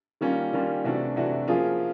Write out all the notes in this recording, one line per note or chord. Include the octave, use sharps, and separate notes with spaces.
D#3 G3 A#3 C#4 F4
D#3 G3 A#3 C#4 F4
C3 E3 A3 D4 F#4
C3 E3 A3 D4 F#4
F3 A#3 C#4 F4 G#4